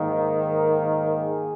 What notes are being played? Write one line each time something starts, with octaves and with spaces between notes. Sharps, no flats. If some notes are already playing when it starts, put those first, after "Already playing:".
Already playing: G#2 D#3 A#3
A#4
A#4
G#4